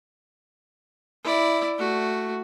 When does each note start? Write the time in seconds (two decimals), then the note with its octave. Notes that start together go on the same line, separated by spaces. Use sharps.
1.24 E4 D5
1.79 A3 F#4